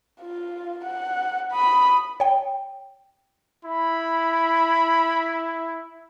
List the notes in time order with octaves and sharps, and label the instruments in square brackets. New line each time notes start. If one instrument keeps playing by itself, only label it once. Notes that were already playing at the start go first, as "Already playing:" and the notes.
[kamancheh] F4
F#5
B5 D#6
[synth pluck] C#5 G5
[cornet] E4 [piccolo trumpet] B5